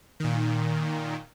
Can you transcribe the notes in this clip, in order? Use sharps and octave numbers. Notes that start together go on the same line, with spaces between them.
A#2 D#3